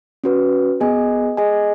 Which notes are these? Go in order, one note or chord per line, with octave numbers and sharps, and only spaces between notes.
C#4 F#4 B4
B3 G#4 D#5 G#5
G#4 D#5 G#5